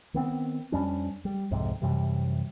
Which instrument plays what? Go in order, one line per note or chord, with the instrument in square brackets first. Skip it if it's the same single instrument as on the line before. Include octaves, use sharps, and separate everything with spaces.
[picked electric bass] D#3 B3 C4
F2 G3 C#4 D4
G3
C2 F2 G#2 C3
F#2 C3 E3 G3